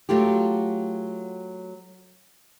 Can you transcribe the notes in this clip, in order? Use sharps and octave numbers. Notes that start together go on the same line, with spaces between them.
F#3 A3 F4 G4